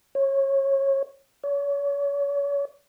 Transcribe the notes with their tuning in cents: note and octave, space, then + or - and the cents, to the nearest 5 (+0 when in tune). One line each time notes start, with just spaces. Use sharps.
C#5 -25
C#5 +35